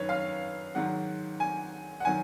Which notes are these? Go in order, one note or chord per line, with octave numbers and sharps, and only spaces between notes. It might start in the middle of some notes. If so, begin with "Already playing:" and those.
Already playing: F#2 D#3 F#3 B4 C#5
F5
G#2 D#3 F#3 F#5
G#5
F#5
D#3 F#3 G#5